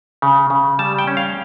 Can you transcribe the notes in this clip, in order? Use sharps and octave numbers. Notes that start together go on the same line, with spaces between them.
C#3
C#3
G3 A5
G5
C#4
F5